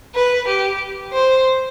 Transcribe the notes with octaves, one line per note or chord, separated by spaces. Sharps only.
B4
G4
C5